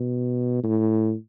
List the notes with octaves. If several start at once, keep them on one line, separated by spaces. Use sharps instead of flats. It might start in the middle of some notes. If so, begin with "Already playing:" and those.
Already playing: B2
A2